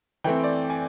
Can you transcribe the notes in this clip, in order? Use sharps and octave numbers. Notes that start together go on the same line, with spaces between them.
E3 A3 C4 G5
D5
G#5